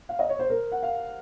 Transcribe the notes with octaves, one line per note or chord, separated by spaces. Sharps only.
F5
D#5
C#5
C5
A#4
F#5
F5